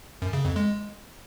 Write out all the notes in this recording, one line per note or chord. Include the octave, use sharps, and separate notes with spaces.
F#2
C#3
F2
G#3